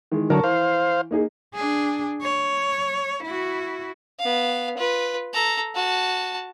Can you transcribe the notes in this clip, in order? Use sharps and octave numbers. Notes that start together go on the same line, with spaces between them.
D#3 E3 G#3
D3 F#3 A#4 A5 C#6
E3 C5 F5
A#3 D#4 G#4
D4 G#4
C#5
E4 F#4
B3 F5
F4 B4
A4 A#5
F#4 A5